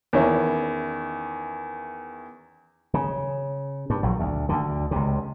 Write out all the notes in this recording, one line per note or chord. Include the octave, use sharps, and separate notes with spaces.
E2 D#3 C#4 E4
C#3
G2
A#1 F#3
D2
D2 D3
C#2 C3